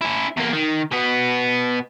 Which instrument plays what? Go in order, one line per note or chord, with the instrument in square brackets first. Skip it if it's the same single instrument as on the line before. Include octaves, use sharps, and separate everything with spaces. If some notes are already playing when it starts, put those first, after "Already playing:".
[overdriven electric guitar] C#4 E4
E2 A#3
D#3
B2 B3